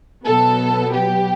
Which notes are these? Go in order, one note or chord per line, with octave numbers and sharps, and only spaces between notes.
B2 F#3 B3 A4
G4